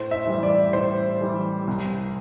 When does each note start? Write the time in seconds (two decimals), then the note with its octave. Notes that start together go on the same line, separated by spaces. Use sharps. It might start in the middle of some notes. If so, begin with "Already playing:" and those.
Already playing: A2 C5
0.11 E5
0.27 E3 G3
0.43 D5
0.73 A2 C5
1.21 E3 G3
1.67 C2